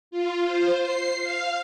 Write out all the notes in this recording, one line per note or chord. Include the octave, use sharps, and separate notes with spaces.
F4
C5
C7
F5